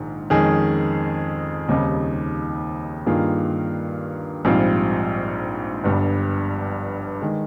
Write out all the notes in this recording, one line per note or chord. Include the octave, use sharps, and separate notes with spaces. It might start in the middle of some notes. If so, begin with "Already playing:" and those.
Already playing: A#1 G#2 D#3
F2 D#3 G#3 C#4 G#4
D#2 C#3 G3 C4 D#4
G2 D#3 A#3 F4 G#4
A#1 G#2 G3 C4 F4
G1 G2 G3
D#3 G#3